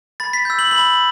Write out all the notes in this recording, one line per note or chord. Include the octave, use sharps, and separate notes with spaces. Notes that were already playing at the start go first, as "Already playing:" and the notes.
B5 A6
B6
E6 G6
F#7
B5 F#7